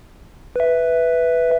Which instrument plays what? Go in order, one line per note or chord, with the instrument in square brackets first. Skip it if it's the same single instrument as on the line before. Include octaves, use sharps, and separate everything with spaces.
[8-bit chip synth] B4 E5